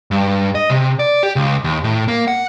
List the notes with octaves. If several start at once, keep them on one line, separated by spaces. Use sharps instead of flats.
G2
D#5
C3
D5
G4
C#2
D#2
A2
A#3
F#5